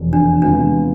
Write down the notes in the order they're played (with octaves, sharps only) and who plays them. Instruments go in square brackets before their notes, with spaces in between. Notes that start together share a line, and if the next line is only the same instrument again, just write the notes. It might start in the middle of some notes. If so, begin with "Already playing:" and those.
Already playing: [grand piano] F1 E2 B2
[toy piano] D4
[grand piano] E2 C3 G#3 B3 F4 [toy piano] D4